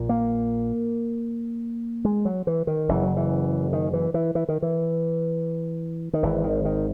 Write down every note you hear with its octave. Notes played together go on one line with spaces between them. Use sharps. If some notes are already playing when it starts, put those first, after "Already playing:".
Already playing: A#1 A#2
A#3
G#3
F#3
E3
D#3
F#1 F#2 C#3 E3
F#3
E3
D#3
E3
E3
E3
D#3
E3
D#3
G#1 G#2 E3
D#3
D#3